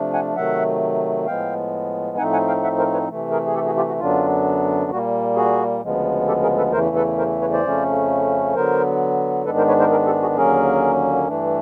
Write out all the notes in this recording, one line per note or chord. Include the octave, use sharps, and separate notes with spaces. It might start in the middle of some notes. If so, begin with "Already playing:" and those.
Already playing: C3 F3 A3 D4
F#5 G#5
C3 D#3 F#3 A3 E5 F#5
A2 F3 G#3 B3 F5 G5
A2 F3 A3 C4 D#4 F#5 G#5
F#5 G#5
F5 G5
E5 F#5
A#4 C5
B4 C#5
C3 E3 A3
G#4 A#4
G#4
G4 A4
F#4 G#4
F4 G4
F#4
F#2 D3 F#3 B3 D4 F4
A#2 G3 A#3 F#4
F#4 G#4
D2 C#3 F3 G#3 B3
G4 A4
G#4 A#4
A4 B4
E2 C#3 E3 A3 A#4 C5
A4 B4
A#4 C5
B4 C#5
C5 D5
F2 C#3 F3 A3 C#4
D3 F#3 B3 A#4 C5
G#2 D#3 G#3 B3 D4 A4 B4
A#4 C5
B4 C#5
A#4 C5
G#4 A#4
G4 A4
F#4 G#4
D#2 D3 F#3 A#3 C#4 G#4 A#4
G2 E3 A3 D4